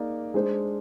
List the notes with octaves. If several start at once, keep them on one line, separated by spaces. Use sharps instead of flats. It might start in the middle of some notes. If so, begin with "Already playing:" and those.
Already playing: A#3 D#4 G#4 D5
G#3 D4 G#4 C5